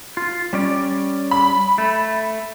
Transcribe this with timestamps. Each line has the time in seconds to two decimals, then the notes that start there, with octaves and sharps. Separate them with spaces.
0.17 F4
0.53 G3 C#4 D5
1.31 B5
1.78 A3